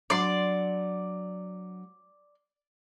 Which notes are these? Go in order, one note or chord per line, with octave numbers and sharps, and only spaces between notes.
F#3 D4 D5 C6